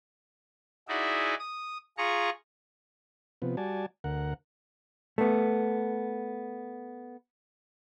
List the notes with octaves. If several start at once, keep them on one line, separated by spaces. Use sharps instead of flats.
D#4 E4 F#4 G#4 D5 E5
D#6
F4 G#4 A#5 C#6
C3 F3 B3
G3 F#4 D5 G#5 A5
D2 A#4 F#5
A3 B3